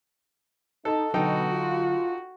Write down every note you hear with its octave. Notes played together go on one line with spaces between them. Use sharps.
D#4 A4 A5
B2 D3 F#3 D#4 F#4 A4 G5
F4